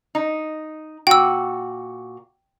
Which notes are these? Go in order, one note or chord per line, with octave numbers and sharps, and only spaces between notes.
D#4
A#2 F#4 G5 E6